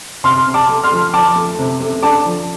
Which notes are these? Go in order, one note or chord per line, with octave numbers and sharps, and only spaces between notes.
C3 C6 F6
C3
A5 D6
A3
C6 F6
F3
F3 A5 D6
A3
C3
A3
D4 A5 D6
F3